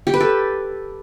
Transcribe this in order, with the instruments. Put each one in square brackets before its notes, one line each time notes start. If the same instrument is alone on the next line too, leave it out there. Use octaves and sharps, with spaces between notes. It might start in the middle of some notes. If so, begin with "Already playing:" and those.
[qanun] G4
B4
A4